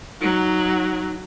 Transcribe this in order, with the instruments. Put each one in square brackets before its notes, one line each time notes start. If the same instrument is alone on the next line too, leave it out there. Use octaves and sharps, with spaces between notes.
[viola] F#3 [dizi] D#4